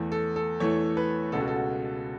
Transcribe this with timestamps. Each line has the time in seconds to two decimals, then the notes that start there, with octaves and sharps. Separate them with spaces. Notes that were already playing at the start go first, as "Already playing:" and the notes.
Already playing: E2 E3 A3
0.12 A4
0.36 A4
0.60 E2 E3 A3 C#5
0.97 B4
1.32 C#2 B2 B3 A4
1.40 F#4
1.48 A4
1.56 F#4